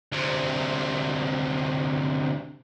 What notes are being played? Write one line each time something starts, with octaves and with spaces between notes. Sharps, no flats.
D2 C3